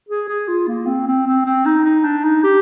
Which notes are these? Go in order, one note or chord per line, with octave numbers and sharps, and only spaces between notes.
G#4
G#4
F4
A#3
C4
C4
C4
C4
D#4
D#4
D4
D#4
G4